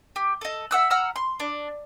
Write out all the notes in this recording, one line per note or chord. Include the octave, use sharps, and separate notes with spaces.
G4
A4 D#5
E5 F#5 E6 F#6
F#5 A#5 E6 F6
C6
D4